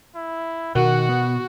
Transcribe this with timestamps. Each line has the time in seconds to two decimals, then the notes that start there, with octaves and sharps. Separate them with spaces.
0.15 E4
0.75 B2 D#3 F#4 F#5
1.09 B3